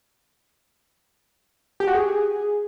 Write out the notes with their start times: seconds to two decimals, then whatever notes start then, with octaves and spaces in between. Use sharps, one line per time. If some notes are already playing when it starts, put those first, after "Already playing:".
1.80 G4
1.87 F#4
1.95 G#4